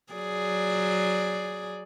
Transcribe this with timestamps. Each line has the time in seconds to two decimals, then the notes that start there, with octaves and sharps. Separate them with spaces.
0.13 F#3 G#4 D5